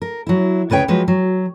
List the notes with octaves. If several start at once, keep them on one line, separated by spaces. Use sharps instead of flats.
A#4
F#3 E4
D2 C#3 B4 C#5 G5
F3 F#3 G#3 B4
F#3